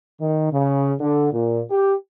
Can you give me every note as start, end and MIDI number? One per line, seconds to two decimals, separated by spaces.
0.20 0.50 51
0.52 0.93 49
0.99 1.28 50
1.33 1.62 46
1.71 1.94 67